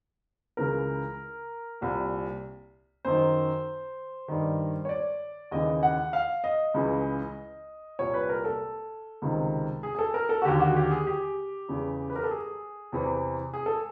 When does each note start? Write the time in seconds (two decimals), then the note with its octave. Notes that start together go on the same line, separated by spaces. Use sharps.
0.57 C#2 C#3 E3 A#4
1.81 C2 A#2
3.05 F#2 D#3 C5
4.28 G2 D#3
4.85 C#5
4.89 D5
5.51 D#2 C#3 E3 D#5
5.83 F#5
6.13 F5
6.44 D#5
6.74 C#2 C#3 E3
7.99 C2 A#2 C#5
8.14 B4
8.29 A#4
8.45 A4
9.22 C#2 C3 D#3
9.83 G#4
9.95 G#4
9.99 A4
10.14 A#4
10.29 A4
10.42 F#4
10.45 D#2 D3 G4
10.60 F#4
10.77 G4
10.91 G#4
11.07 G4
11.69 E2 C#3 E3
12.10 B4
12.16 A#4
12.24 A4
12.31 G#4
12.92 E2 C3 E3
13.53 G#4
13.66 A4